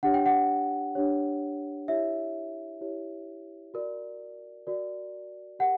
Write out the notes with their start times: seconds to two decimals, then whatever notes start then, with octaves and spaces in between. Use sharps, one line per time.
0.03 D4 G4 C#5 F#5
0.14 G5
0.26 F#5
0.95 D4 G4 C#5
1.88 E4 G4 C#5 E5
2.81 E4 G4 C#5
3.74 F#4 A#4 D5
4.67 F#4 A#4 D5
5.59 G4 A#4 F#5